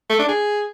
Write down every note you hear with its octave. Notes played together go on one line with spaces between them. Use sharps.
A3
D4
G#4